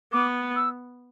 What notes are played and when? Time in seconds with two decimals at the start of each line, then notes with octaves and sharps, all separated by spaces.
0.13 B3 D6
0.56 E6